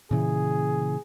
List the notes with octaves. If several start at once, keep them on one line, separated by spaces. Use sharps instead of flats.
A#2 C#3 E3 G#4